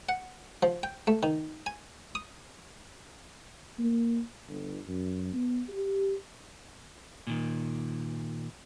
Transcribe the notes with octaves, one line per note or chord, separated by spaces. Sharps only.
F#5
F3
G5
A3
D#3
G#5
D#6
A#3
G1
F#2
B3
G4
A#2 D#3